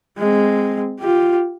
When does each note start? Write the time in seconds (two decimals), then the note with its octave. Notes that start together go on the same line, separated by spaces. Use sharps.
0.19 G#3 C4
1.00 F4 G4